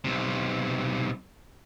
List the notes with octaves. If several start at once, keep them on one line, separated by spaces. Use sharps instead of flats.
B1 C3